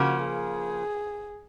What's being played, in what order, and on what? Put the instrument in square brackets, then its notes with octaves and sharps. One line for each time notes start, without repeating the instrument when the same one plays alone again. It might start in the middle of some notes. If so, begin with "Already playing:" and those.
Already playing: [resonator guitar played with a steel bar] C#3 F3 A#3 [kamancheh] F#4
[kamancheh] G#4